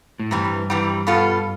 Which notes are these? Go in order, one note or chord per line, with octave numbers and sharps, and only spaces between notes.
A2
G2 C3 E3 G3
C3 E3 G3
B2 B3 F4 A4